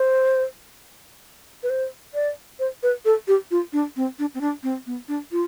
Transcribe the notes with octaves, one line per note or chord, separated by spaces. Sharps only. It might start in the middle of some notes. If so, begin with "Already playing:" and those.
Already playing: C5
B4
C5
D5
C5
B4
A4
G4
F4
D4
C4
D4
C4
D4
C4
B3
D4
F4